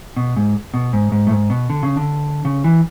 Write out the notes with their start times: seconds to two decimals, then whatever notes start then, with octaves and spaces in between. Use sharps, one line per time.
0.17 B2
0.36 G#2
0.74 B2
0.93 G#2
1.12 G#2
1.27 A2
1.31 G#2
1.50 B2
1.70 D3
1.83 C#3
1.96 D3
2.45 C#3
2.64 E3